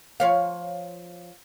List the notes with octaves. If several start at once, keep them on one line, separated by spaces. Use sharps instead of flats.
F3 C#5 F5